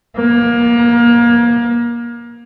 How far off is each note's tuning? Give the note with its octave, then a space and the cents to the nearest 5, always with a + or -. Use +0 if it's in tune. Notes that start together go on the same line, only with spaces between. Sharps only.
A#3 +25